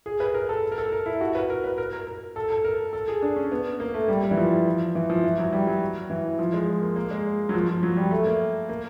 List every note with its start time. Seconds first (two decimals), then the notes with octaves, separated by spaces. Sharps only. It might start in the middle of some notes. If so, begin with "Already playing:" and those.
0.06 G#4
0.20 B4
0.34 A#4
0.49 A4
0.72 A#4
0.78 A4
0.92 A#4
1.06 E4
1.21 F#4
1.35 B4
1.50 A#4
1.64 B4
1.78 A#4
1.93 A#4
2.07 A#4
2.36 A4
2.50 A4
2.64 A#4
2.93 A4
3.08 G#4
3.22 D4
3.36 C#4
3.52 B3
3.80 A#3
3.94 A3
4.08 G3
4.23 G3
4.31 E3
4.37 F3
4.95 E3
5.10 F3
5.24 E3
5.38 F#3
5.53 G3
5.67 F#3
6.10 E3
6.39 F3
6.54 G#3
6.82 A#3
6.96 A#3
7.11 G#3
7.49 F#3
7.54 F3
7.69 F3
7.83 F#3
7.97 G3
8.11 A3
8.26 A#3
8.69 A#3